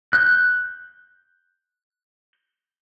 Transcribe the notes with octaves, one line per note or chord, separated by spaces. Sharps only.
F#6 G6